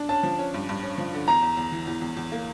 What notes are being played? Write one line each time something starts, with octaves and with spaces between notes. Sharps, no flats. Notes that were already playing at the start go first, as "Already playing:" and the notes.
Already playing: D4
C#4 A5
F3
C#4
G2
G2
C#4
F3
D3
E2 A#5
E2
E2
E3
E2
E2
E2
A#3